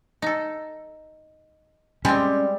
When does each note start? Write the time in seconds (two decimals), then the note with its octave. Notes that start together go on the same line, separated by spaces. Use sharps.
0.22 D#4 A4
2.05 G3 G#3 C4 C#4